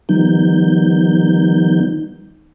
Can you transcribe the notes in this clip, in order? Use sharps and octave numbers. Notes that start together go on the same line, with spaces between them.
D#3 F3 G3 B3 D#4 G6